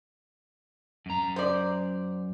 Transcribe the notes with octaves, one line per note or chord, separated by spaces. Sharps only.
F#2 A#5
C5 D5